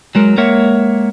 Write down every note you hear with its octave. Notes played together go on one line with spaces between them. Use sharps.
F#3 G#3 A#4
G#3 A#3 A#4 C#5 E5 F#5